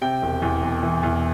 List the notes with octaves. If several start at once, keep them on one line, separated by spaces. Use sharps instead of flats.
C3 G5
E1
E2
E1
E3
E2